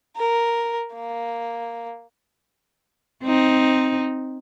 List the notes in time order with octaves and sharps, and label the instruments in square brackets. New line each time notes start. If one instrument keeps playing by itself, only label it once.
[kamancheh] A#4
A#3
[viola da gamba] C4 D#4